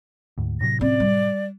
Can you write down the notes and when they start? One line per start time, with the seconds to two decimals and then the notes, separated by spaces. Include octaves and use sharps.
0.38 D2 G#2
0.61 A2 C3 F#3 A#6
0.81 C4 C#4 D5
1.00 G3